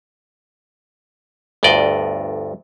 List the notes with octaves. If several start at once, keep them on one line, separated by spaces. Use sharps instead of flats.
G1 D2 G2 D5 D#5